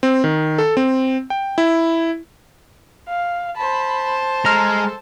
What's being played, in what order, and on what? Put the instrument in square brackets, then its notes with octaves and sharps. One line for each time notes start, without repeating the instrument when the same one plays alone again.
[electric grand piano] C4
D#3
A4
C4
G5
E4
[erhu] F5
[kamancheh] C5 A5 [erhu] B5
[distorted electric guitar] G#3 [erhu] A4 [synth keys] A#5 F6